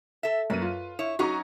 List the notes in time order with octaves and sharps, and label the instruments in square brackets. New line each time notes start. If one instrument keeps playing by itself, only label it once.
[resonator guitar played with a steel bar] A4 E5
[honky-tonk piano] F#2 A#3 D#7 [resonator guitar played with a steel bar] B4
[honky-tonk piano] F4
[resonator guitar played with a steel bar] E4 C#5
[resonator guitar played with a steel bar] F#3 C#4 D#4 [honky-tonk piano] F#4 A#5 C#6